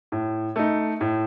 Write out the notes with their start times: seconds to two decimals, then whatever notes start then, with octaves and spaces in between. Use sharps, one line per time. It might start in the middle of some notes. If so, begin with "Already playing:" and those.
0.12 A2
0.56 A3 D#4
1.01 A2